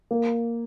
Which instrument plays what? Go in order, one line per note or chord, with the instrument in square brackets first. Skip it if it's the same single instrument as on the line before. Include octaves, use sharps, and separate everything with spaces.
[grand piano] A#3